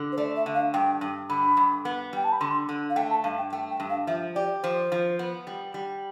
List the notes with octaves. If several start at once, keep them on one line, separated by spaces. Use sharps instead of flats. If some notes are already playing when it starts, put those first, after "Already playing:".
Already playing: D3
C5
A3 D5
E5
D3
F5
G2 G5
G2
D3 B5
G2
B3
G3 G5
A5
B5
D3 C6
D3
F5
A3 G5
A5
G2 F5
G5
A3 G5
G5
G2
F5
F3 E5
G4 D5
F3 C5
F3
B3
G3
G3